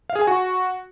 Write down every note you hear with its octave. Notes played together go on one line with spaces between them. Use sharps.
F5
G#4
G#5
F#4